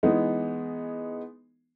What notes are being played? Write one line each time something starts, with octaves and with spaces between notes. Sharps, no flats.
E3 G#3 B3 D#4